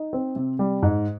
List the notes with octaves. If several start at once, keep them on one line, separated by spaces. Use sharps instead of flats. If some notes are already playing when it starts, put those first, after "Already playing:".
Already playing: D#4
C4
C3
G3
G#2